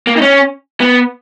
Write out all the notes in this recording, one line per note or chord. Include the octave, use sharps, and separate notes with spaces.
A#3
D#4
C#4
B3